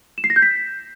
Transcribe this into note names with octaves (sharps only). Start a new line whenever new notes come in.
E7
C7
A#6
G6
B6